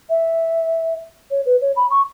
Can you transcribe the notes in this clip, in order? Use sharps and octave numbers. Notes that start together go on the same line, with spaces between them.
E5
C#5
B4
C#5
B5
C#6